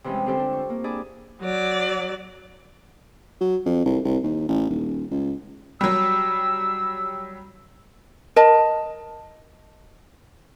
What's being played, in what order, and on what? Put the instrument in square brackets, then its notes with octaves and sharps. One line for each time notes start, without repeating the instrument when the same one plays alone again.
[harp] C3 E3 F3 G3 G#3 C#4
D3 C4 F4 G4 A4 C5
D4
C#6
A#3
D4 E4 G#4 D5
[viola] F#3 D5
[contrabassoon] F#3
F2
C2
C2
D#2
A1
D#1
C#2
[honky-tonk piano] F#3 G3 [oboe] E6
[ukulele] A#4 D#5 A5